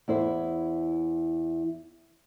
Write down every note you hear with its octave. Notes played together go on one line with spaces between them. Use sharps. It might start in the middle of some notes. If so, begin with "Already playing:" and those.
E2 E4 C5 E5